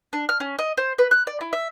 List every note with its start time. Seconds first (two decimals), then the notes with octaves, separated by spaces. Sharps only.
0.13 D4
0.29 F6
0.40 C#4
0.59 D#5
0.77 C5
0.98 B4
1.11 F#6
1.27 D5
1.41 E4
1.53 E5